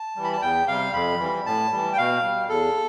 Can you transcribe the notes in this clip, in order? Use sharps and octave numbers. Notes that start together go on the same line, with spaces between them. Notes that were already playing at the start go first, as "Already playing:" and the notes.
Already playing: A5
E3 G3
B5
A5
E2 G5
C3 G3 F5
F2 B5
E3 G3
A2 A5
E3 G3
G5
B2 F5
G3
E2 A4